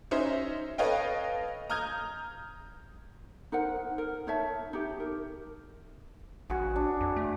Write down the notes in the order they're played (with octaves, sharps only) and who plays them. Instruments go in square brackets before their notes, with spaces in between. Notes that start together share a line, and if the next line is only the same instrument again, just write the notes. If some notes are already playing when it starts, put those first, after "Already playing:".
[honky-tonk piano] C#4 D#4 C5 E5
A4 B4 C#5 D#5 F5 G5
A#5 D#6 F6 G6 G#6
[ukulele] D#4 A#4 C5 F#5
A#4
D#4 C#5 E5 A5
D#4 G4
A#4
[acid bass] A1 [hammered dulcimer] F#4 G#4
[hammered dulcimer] D4
[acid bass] F2
A3